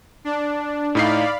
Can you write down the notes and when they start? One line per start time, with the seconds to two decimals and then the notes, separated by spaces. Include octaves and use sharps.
0.25 D4
0.95 A2 D#4 D5 F5 B5 C7